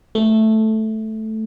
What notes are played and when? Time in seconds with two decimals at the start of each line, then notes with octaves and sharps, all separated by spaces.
0.15 A3